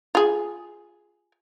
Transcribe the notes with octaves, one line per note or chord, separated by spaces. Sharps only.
F4 G#4